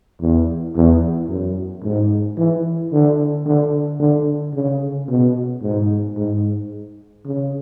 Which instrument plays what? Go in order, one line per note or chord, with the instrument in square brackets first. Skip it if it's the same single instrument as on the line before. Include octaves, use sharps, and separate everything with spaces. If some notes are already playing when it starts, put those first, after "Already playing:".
[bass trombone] E2
E2
F#2
G#2
E3
D3
D3
D3
C#3
B2
G#2
G#2
C#3